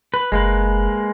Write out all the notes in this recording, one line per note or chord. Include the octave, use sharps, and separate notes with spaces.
B4
F#1 G#3 A#3 B4